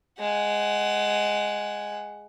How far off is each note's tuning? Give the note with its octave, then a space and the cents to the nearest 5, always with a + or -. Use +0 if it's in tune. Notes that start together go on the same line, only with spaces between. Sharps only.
G#3 +0 F#5 +15